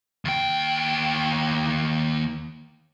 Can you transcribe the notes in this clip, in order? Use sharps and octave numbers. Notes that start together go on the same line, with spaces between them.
D#2 G5